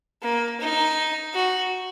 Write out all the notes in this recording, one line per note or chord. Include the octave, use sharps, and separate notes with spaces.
A#3
D#4
F#4